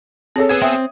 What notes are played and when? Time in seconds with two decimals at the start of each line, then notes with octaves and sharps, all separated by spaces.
0.36 C4 G#4 A4 C#5
0.49 B3 G#4 E6 G#6 D#7
0.62 C4 E5 G5 D#6